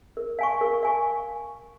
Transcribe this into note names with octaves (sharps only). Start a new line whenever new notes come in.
A#4
F5 G#5 C#6
A#4
F5 G#5 C#6